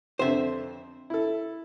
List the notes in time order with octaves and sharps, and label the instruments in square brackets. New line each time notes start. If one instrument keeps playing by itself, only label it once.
[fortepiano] F2 D3 [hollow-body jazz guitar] C5 E5
[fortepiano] E4 A4